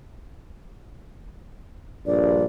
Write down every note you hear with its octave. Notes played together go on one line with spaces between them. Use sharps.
A#1 G2 D5